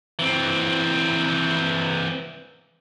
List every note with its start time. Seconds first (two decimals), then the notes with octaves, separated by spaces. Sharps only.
0.19 E3 C4